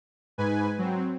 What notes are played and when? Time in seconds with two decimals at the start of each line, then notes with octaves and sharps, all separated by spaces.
0.38 G#2 B4 G#5
0.78 F#3 C4